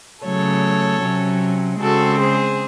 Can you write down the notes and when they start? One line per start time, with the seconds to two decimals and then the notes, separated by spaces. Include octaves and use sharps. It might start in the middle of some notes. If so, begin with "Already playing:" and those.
0.23 C#3 F#3 A3 A4 C#5
1.02 C3 F#3 C#4
1.80 C#3 G#3 C4 F#4 A4
2.19 G#4 C5